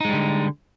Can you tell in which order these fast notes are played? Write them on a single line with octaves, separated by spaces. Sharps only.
D#4 G#3 G3 D3